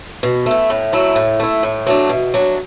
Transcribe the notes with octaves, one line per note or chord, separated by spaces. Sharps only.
B2
A3 E4
A2
F#3 A3 E4
A2
A3 E4
A2
F#3 A3 D4
B2
F#3 D4